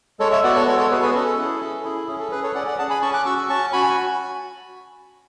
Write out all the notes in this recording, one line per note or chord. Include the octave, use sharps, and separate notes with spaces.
G#3 A4 C#5
C#5 E5
B3 F#4 D5 F#5
A4 C#5
G#3 A4 C#5
A4 C#5
B3 F#4 G#4 B4
G#4 B4
C#4 A4
E4 G#4
C#4
E4 G#4
C#4 G#4
A4
G#4 B4
A4 C#5
C#4 D5 F#5
D5 F#5
G#4 F#5 A5
G#5 B5
C#4 A5 C#6
D6 F#6
F#4 C#6 E6
C#4 A5 C#6
F#4 G#5 B5